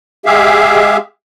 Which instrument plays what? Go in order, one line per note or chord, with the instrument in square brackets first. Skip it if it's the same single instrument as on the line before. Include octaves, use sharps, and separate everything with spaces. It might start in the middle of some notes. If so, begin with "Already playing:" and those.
[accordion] G#3 G4 G#4 E5 F5